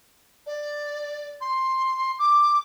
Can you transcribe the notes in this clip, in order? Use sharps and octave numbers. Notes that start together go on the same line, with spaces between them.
D5
C6
D6